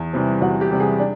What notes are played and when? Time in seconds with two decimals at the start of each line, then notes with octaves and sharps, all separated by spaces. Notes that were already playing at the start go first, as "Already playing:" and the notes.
Already playing: E2
0.13 C3 E3 G3
0.41 E2 F#4
0.61 G4
0.71 C3 E3 G3
0.80 G#4
0.99 D4